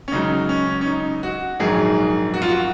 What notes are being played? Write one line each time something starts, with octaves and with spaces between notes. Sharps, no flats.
C#4
C#2 C#3 F#3 D#4
C#4
C#4
D#4
F#4
A#1 G#2 D#3 F#3 G#4
F#4
F4
F#4